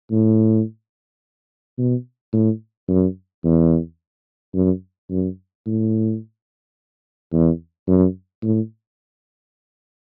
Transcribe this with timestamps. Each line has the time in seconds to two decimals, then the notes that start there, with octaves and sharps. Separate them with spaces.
0.11 A2
1.78 B2
2.33 A2
2.88 F#2
3.44 E2
4.54 F#2
5.10 F#2
5.66 A2
7.33 E2
7.88 F#2
8.43 A2